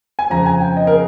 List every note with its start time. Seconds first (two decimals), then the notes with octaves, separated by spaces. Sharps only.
0.19 G#5
0.30 F2 C#3 F3 A#5
0.46 G#5
0.61 G5
0.77 D#5
0.87 A#4
0.92 G#4